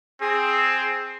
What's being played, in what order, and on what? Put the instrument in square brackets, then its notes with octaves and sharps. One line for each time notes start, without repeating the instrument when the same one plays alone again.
[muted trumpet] C4 [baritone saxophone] G#4